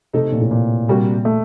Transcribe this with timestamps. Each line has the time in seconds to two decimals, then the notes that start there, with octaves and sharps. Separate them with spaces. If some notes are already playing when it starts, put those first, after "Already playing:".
0.13 C3 A3 D#4 A4
0.32 A#2
0.41 A2
0.51 A#2
0.88 C3 G3 A#3 F#4
1.25 A3